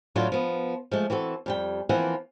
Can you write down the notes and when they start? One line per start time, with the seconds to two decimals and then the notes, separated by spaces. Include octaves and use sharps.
0.15 A2 F#3 A3 D4 F4
0.32 F3 B3
0.91 F3 G#3 A3
1.10 E3 C4 F#4 A4
1.46 F2 G3 G5
1.89 E3 F3 A#3 C4 F#5